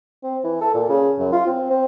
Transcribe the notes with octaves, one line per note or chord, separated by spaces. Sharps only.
C4
E3
A4
A#2
C#3
F#2
F4
C4
C4